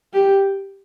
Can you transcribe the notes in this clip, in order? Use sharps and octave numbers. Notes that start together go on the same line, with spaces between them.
G4